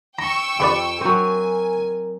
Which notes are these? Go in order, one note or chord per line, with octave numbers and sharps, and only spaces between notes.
G5 A#5 C#6 E6
F2 C3 B4 D5
F#3 C4 A#4 G#5